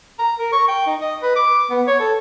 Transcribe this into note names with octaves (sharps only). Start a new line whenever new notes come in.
A#5
A#4
C#6
G5
D#4
D#5
B4
D6
B3
C#5
A4